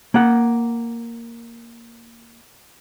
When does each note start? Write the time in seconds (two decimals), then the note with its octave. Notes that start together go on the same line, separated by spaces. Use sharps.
0.14 A#3 F#5